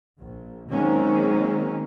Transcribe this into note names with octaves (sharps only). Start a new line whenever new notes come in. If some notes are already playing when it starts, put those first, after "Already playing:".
A#1
D#3 F#3 G#3 A#3 C4 C#4